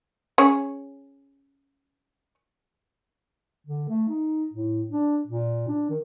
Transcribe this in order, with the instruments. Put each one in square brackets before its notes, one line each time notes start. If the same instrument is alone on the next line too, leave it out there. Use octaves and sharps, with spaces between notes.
[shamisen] C#4 G#4 C#5
[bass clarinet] D3
A3
D#4
A2
D4
A#2
D4
D#3